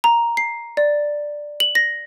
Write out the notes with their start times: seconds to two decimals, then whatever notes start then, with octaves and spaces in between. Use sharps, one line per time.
0.04 A#5
0.37 C7
0.77 D5
1.60 F#7
1.75 A#6